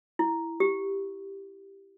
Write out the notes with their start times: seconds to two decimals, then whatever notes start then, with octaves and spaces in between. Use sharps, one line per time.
0.19 E4
0.60 G4